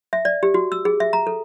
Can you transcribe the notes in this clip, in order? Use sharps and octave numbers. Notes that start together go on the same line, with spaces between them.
E5
D5
G4
F#4
E6
G#4
E5
A#5
A4